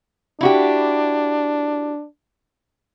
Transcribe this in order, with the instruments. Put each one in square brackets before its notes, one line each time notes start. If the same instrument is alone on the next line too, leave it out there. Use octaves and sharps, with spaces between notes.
[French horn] D4 [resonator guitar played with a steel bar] E4 F#4 G4